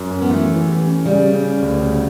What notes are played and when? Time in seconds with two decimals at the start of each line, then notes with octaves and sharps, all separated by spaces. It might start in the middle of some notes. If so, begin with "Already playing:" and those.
Already playing: F#2
0.11 C#4
0.22 B3
0.30 E3 A3
0.48 E3
0.68 G4
0.87 C#4
1.05 C#3 G3
1.24 C#3
1.43 C#4
1.62 D2
1.80 C#3